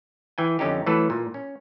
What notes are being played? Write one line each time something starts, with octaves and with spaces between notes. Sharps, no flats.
E3 G5 G#5
F2 D3 C#4 D#4 G4
E3 F#3 A3 A4 B4
A#2
C#4